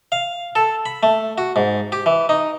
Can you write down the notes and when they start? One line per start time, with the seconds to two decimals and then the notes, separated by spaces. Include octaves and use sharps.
0.12 F5
0.55 A4
0.86 B5
1.03 A3
1.38 F#4
1.56 G#2
1.92 G4
2.06 E3
2.29 D#4